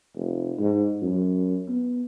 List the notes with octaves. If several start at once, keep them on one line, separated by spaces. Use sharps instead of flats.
F1
G#2
F#2
B3